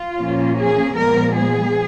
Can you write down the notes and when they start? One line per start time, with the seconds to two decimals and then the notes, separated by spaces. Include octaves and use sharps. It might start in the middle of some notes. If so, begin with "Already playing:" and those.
Already playing: F4
0.17 A#2 F3 A#3 C#4
0.57 G#4
0.95 A#2 F3 G#3 B3 A#4
1.36 G#4